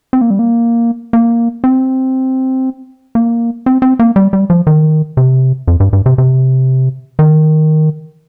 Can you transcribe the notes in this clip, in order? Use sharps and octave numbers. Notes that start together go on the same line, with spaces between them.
C4
A#3
G3
A#3
A#3
C4
A#3
C4
C4
A#3
G3
G3
F3
D#3
C3
F2
G2
G2
C3
C3
D#3